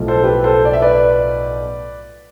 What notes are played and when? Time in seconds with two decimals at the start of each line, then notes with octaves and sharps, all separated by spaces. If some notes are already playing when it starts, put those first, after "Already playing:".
Already playing: B1 A2 F3
0.08 A4 C5
0.23 G4 B4
0.44 A4 C5
0.65 D5
0.73 E5
0.82 B4 D5